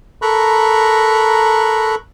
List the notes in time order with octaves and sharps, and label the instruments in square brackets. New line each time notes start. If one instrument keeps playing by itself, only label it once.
[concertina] A4 A#4 A#5 B5 C#6 F#6